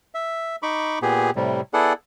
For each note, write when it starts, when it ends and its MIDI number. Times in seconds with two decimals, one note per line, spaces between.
0.15 0.56 76
0.63 0.99 63
0.63 0.99 83
0.63 0.99 85
0.63 0.99 86
1.02 1.30 46
1.02 1.30 59
1.02 1.30 67
1.02 1.30 68
1.36 1.61 45
1.36 1.61 48
1.36 1.61 55
1.74 1.93 59
1.74 1.93 64
1.74 1.93 68
1.74 1.93 69
1.74 1.93 74
1.74 1.93 78